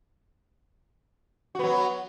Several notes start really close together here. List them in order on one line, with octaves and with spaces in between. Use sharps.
F#4 B3 F#3